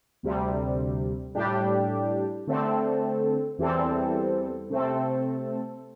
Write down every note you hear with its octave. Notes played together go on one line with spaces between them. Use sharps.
D2 C3 G3
A2 G3 D4 G4
D3 A3 C4 A4
E2 E3 G3 C4 A4
C3 A3 C4 A4